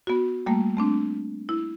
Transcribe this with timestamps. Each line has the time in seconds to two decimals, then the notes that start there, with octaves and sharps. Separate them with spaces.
0.07 B3 F#4
0.46 G3 A3 A#3
0.77 A3 C4 D4
1.49 E4